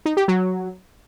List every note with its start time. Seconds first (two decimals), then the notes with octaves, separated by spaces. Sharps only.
0.06 D#4
0.17 G4
0.28 F#3